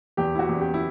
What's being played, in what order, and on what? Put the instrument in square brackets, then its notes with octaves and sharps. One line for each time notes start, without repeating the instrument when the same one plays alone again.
[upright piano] E2 G4
E4
F#4
E2
G4
E4